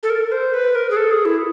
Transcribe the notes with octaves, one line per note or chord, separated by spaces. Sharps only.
A4
A#4
C5
B4
A#4
G#4
A4
G#4
E4